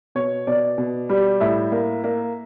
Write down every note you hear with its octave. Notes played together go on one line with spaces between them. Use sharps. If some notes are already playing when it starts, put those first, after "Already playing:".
B2 C#5
B2 D5
B2
G3
A2 E5
A#3
A#3